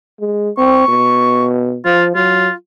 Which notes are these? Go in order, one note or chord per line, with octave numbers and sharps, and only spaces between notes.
G#3
C4 C#6
B2
F3 F4
F#3 F4